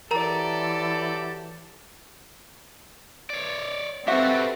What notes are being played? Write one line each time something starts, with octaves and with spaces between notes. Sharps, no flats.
E3 F#3 G4 A4 A#4 D5 A5 A#5
C#5 D5
C4 F#4 G4 A4 B4 E5